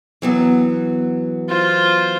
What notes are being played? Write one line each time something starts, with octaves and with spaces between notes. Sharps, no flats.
E3 F#3 B3
F4 C5